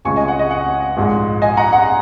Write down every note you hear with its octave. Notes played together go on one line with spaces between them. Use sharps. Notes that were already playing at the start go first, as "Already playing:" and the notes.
C#2 C#3 G#3 G#5 C#6
D#5 G#5
F#5
D#5
F#5
A#1 G#2 G#3
D#5 G#5
F#5 A#5
F#5